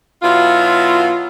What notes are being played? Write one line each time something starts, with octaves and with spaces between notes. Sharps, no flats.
B2 F#3 E4 F4